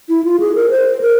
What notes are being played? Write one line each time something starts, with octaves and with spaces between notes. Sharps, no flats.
E4
F4
G#4
A#4
C5
A#4